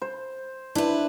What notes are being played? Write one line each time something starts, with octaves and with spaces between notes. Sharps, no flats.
C5
D4 E4 B4